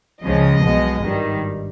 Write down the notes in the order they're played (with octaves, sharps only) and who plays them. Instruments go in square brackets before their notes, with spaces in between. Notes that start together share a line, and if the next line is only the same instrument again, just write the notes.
[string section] C#2 C#3 F3 G#3 D#5
B1 B2 G#3
G#1 G2 D#3 G3